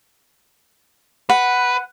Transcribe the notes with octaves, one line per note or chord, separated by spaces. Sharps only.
B4 F#5